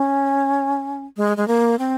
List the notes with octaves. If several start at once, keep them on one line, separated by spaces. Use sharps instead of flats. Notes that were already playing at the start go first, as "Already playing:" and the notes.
Already playing: C#4
G#3
G#3
A#3
C4